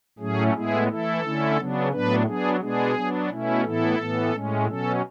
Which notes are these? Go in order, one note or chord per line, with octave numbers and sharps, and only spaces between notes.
A2 F#3 A3 C#4 G#4
A2 G#3 B3 E4 G#4
E3 A3 E4 A4
D3 A3 C#4 E4
C#3 F#3 B3 D4
A2 F#3 B3 D4 B4
F#3 B3 D4 G#4
B2 G#3 B3 D4 G#4
F#3 B3 D4
B2 A3 C#4 E4
A2 E3 B3 E4 A4
A2 E3 B3
A2 G#3 C#4
B2 F#3 C#4 A4